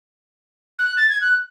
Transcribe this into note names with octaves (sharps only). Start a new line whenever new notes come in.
F#6
A6
G#6
F#6